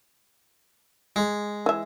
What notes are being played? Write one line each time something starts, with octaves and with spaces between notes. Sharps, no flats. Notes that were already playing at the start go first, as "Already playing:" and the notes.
G#3
E3 E5